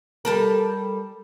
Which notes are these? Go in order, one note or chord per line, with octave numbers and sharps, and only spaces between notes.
G3 A4 A#4